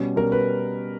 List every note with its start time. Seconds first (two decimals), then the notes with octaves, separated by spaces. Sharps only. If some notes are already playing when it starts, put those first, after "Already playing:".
Already playing: B2 G3 C#4
0.16 B2 G3 C#4 A#4
0.32 B4